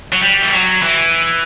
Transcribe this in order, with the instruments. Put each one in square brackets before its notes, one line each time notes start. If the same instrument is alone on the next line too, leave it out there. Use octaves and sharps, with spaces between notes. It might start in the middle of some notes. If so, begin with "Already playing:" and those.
[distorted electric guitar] F#3
G3
E3
F#3
E3